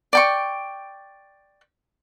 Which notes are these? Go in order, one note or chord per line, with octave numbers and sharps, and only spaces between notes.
D5 G5 C#6